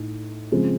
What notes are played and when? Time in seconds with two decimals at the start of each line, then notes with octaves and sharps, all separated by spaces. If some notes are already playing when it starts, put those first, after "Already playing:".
Already playing: A2 D#4
0.52 C#3 F3 G#3 C4